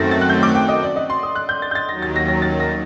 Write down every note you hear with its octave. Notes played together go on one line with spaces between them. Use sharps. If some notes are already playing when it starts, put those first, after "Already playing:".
Already playing: F#2 D#3 A3 C4 F#4 A6 A#6
A6
F#6
G6
D6
G5
D#5
D5
D#5
C6
D#6
F#6
G6
A6
G6
A6
D#2 D#3 F#3 A#6
A6
A#6
A#6
A6
A#6